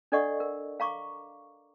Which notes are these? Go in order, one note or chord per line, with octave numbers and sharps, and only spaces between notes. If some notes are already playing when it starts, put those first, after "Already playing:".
D4 A4 D5 D#5 F#5 C#6
A#4
F5 A#5 C#6 D6